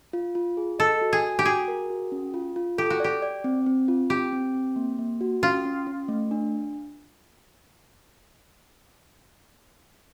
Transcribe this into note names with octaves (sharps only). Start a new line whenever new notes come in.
F4
F4
G#4
A4 D#5
F#4
G#4
G#5
G4
F#4 G#4
A#4
F#4
C#4
F4
F4
G4 A4
F#4
G4 D5
D5
C4
C4
F4
C4 G4
C4
C4
A#3
A#3
F#4
C#4 F4
C#4
C#4
A3
D4